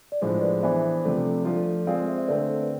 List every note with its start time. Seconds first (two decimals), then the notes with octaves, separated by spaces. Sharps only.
0.12 D5
0.21 A2 F3 G#3 D4 C5
0.42 B4 D5
0.62 E3 B3 D4 C5 E5
1.04 C3 F3 A3 D4
1.45 F3 A3 D4 F4
1.86 G#3 C4 F4 G#4 D5 F5
2.08 C5 E5
2.18 E5
2.28 D3 A3 C4 B4 D5
2.62 B4